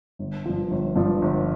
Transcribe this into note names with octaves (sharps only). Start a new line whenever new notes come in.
G1
G2 F3
G1
G2 F3
G1